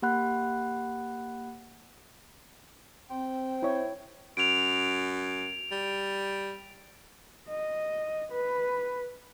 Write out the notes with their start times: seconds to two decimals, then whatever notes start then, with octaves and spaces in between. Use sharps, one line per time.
0.02 A#3 G4 F#5 B5 F#6
3.10 C4 C5 G5
3.63 E4 C#5
4.37 F#2 D7 F7
5.71 G3
7.49 D#5
8.32 B4